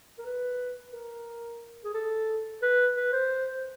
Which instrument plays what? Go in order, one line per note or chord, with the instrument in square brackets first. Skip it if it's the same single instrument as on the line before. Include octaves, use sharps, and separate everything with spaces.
[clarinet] A#4
B4
A#4
G#4
A4
B4
B4
C5